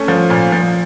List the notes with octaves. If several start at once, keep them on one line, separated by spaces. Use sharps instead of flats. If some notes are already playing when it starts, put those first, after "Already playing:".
Already playing: A3 C#4
F3
A#2
F3